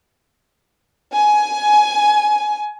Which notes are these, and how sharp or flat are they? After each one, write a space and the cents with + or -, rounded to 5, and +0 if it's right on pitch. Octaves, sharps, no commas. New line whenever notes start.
G#5 +20